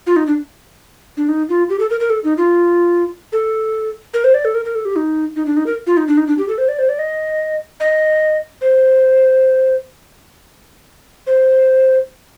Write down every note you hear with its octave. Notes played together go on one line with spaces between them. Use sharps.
F4
D#4
D4
D4
D#4
F4
G4
A4
A#4
A#4
A4
D#4
F4
A4
A#4
C5
D5
A4
A#4
A#4
A4
G4
D#4
D#4
D4
D#4
A#4
F4
D#4
D4
D#4
D4
G4
A4
C5
D5
C5
D5
D#5
D#5
C5
C5